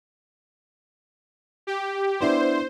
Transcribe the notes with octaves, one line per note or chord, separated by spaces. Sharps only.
G4
B3 D4 E4 C5